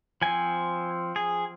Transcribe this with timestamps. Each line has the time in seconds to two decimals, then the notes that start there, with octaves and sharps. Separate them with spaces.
0.22 F3 C4 G#5
1.16 G#4